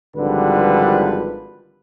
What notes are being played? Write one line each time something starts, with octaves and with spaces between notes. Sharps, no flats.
G#1 D3 F3 G3 B4